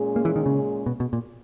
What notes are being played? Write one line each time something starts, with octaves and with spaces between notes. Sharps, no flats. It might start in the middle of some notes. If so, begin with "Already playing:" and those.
Already playing: A#2 G#3 C#4 G#4
A#3
E3
D#3
C#3
B2
B2
A#2